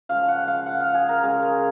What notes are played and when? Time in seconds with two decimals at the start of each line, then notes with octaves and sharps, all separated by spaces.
0.09 C#3 F3 G#3 F5
0.28 F#5
0.48 F5
0.66 F#5
0.80 F5
0.94 G#4
1.09 A#4
1.23 C#3 G#3 G#4
1.42 G#4